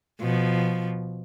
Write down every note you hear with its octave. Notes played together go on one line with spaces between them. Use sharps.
B2 F3